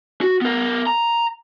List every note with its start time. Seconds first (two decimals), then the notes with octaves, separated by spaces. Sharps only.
0.21 F#4
0.41 B3 A#4
0.87 A#5